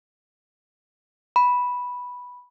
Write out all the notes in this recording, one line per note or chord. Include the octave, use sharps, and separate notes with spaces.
B5